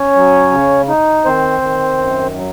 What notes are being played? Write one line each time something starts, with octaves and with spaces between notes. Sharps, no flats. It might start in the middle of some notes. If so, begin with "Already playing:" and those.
Already playing: C#4 C#5
F#3
C#3
D#4
D#3 C4 C5
D#3
F#2
F#3